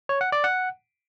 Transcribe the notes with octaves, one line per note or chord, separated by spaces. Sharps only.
C#5
F#5
D5
F#5